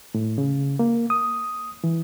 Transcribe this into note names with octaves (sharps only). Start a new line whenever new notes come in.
A2
C#3
A#3
D#6
E3